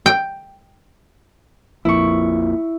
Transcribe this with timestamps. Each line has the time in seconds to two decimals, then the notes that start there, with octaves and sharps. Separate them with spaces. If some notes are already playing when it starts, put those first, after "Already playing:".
0.06 G5
1.85 A#1 F2 A#2 E4 C#6